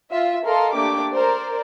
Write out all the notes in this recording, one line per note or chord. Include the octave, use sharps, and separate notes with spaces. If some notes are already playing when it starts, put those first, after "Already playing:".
F4 E5
A4 A#4 D#5 F5 C6
A3 A#3 D4 G4 D6
A#4 C5 D5